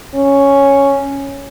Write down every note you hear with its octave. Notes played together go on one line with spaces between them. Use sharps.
C#4